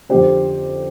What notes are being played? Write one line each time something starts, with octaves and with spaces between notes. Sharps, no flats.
F2 D3 F3 G4 C5